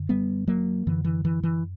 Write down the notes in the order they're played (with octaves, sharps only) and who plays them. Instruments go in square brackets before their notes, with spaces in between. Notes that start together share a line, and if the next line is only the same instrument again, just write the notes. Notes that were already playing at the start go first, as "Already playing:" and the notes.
Already playing: [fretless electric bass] F#2 D3
G3 B3
F#3 A#3
F#2 D3 E3
E3
E3
E3